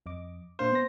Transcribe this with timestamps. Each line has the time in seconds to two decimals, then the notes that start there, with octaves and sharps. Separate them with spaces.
0.06 F2 D#5 D6
0.59 A#2 D4 C5 F5
0.72 B3 A#6